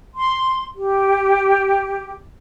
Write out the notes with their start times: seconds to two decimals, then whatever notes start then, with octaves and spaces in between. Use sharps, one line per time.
0.14 C6
0.76 G4